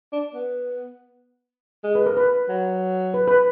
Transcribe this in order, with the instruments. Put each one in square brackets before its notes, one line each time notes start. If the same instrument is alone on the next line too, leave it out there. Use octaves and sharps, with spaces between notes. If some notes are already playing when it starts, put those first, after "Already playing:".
[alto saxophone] D4
B3
G#3
[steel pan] B4
A#4
B4
[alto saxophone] F#3
[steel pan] B4
B4